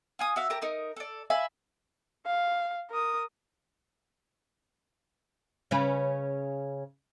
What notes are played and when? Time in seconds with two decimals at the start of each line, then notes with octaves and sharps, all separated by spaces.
0.19 F4 G#5 D#6
0.36 F#4 E5 F5
0.50 G4 A#4 A5 A#5
0.62 D#4 A#4 D#6
0.96 A4 D5
1.30 E5 F5 G#5 B5
2.26 F5
2.91 A#4 D#6
5.71 C#3 C#4 B4